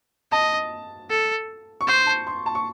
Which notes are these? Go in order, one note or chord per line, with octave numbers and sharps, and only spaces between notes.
D#5 A5
A4
C#6
C5 C6
A5
C6
A5
C#6